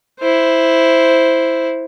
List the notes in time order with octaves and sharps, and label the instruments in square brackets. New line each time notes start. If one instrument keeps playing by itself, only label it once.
[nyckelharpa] E4 C5